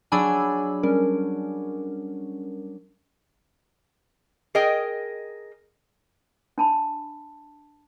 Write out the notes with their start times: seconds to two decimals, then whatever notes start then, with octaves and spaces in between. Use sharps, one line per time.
0.12 F#3 D4 G#4 G#5 B5 E6
0.83 G3 C#4 A#4
4.55 G#4 A#4 D#5 G5
6.58 D4 A5 B5